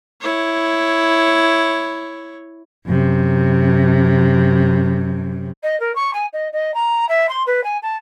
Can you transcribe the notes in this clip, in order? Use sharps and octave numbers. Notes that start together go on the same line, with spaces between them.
E4 C#5
F#2 C3
D#5
A#4
C#6
G#5
D#5
D#5
A#5
E5
C6
B4
G#5
A5